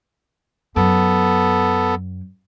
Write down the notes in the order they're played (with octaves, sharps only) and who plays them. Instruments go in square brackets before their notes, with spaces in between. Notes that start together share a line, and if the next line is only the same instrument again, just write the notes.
[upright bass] F#2 [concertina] B3 A4